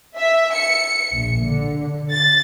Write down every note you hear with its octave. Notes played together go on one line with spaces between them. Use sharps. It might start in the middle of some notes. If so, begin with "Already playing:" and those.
E5
C#7
A#1
D3
A6